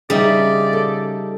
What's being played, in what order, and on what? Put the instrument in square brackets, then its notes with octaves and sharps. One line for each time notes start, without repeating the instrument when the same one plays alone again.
[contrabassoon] C#3 [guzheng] G3 D#4 [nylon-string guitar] G#4 E5 [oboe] D5
[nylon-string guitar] A4